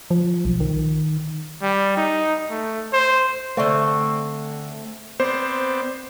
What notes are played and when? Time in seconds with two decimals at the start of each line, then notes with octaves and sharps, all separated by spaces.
0.10 F3
0.45 B1
0.60 D#3
1.62 G3
1.97 D#4
2.50 A3
2.93 C5
3.57 D3 A3 C4
5.20 B3 C4 C5 D5